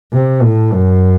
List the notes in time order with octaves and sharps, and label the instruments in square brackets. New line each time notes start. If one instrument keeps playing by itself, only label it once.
[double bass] C3
A2
F#2